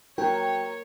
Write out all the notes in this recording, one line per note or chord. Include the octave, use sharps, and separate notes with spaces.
F#3 A#4 C#5 G5